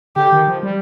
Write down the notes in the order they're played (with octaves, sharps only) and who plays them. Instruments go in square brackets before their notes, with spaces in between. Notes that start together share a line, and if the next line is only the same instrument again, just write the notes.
[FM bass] D3 [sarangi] G4
[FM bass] D#3
F3
G3